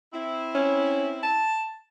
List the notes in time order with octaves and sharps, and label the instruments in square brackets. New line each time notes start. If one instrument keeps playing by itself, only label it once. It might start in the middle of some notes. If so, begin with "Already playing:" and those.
[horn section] C4 E4
[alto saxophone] C#4
A5